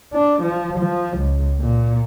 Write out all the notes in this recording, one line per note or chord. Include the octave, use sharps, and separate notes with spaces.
D4
F3
F3
C#2
A#2